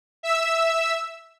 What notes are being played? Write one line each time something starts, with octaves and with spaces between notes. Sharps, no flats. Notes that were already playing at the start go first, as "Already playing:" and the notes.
E5 E6